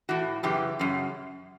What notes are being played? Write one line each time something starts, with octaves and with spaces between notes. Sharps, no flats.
A2 E3 F#4
F#2 C#3 E3 G4
F#2 C#3